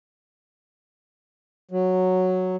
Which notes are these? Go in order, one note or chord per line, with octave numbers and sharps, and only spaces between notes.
F#3